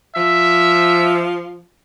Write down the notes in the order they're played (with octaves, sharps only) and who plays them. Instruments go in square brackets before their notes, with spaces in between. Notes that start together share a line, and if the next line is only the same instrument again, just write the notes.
[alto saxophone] F3 [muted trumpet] E5